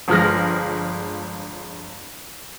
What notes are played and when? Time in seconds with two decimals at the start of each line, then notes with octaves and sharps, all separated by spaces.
0.08 G1 F3 G#3 F6 A#6